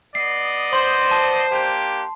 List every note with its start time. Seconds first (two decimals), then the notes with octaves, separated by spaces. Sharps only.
0.15 B3 D5 D#5 C7
0.73 C5 C6
1.11 A5
1.51 A#3 D4 G4